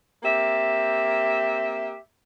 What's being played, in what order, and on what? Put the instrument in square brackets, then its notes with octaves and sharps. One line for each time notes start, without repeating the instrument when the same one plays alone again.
[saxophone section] A#3 C4 G4 E5